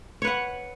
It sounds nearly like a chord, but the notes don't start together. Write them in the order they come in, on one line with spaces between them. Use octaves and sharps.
C#5 B4 F#5